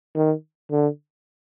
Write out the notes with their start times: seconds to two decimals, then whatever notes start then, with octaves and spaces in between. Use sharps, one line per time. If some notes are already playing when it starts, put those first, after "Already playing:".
0.15 D#3
0.71 D3